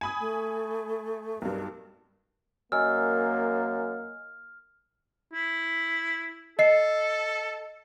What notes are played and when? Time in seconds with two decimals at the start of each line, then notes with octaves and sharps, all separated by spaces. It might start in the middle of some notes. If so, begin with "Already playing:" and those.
0.01 G#5 B5 D#6
0.20 A3
1.42 B1 G2 A#4
2.72 F#2 A#3 D#5 G#5 E6 F6
5.33 E4
6.59 A4 D#5 C7